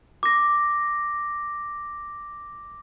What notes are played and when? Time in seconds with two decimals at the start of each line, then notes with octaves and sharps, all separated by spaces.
0.23 D6 A#6